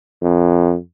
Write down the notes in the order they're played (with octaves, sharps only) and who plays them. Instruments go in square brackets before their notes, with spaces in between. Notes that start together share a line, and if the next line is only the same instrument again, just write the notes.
[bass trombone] F2